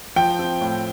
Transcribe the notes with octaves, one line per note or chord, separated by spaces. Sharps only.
F3 G5
C4
A2